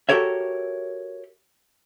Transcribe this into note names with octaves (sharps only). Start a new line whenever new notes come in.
F#4 G4 A4 A#4 C#5 E5